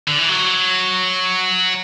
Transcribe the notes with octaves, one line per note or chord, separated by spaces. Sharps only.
D3
E3
F#3